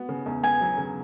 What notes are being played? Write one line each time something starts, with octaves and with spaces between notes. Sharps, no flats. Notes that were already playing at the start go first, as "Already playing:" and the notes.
Already playing: B3 F#4
C#3
E2
B3 G#5
F#3
C#3